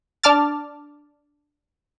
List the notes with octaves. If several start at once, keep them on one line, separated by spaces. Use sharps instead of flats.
D4 A5 D6 F6 A6